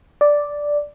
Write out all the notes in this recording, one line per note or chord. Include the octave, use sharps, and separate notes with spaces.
D5